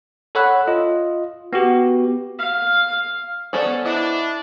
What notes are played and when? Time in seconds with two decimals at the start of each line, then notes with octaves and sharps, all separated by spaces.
0.35 A4 C#5 F#5 B5 E6 F#6
0.68 F4 D#5
1.53 B3 F#4 G4
2.39 F5
3.53 B3 C#4 A4 C5 D5
3.85 D4 E4 D#5